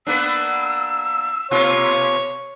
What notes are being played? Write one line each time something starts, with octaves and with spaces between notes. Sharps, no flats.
A#3 B3 D4 E6
B2 A#3 F4 C#5